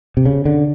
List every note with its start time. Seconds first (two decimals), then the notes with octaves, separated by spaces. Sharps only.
0.17 C3
0.26 C#3
0.45 D3